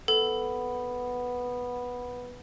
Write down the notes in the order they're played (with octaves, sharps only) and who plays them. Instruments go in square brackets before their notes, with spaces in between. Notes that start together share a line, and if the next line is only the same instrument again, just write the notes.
[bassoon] B3 [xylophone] A4